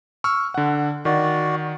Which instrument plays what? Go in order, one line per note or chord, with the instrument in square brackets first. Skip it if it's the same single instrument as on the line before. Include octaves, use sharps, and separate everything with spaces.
[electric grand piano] C#6 E6 F6
D3 F#5
[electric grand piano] D#3 [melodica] F#4 D5